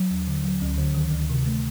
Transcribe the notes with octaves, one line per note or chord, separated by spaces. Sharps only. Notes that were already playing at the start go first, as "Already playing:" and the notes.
Already playing: F#3
D#2
D3
F#3
D2
D3
D#3
D2
C3
A3